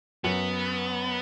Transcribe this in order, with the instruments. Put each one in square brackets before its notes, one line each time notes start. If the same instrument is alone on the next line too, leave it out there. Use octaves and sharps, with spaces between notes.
[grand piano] F#2 [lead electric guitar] B3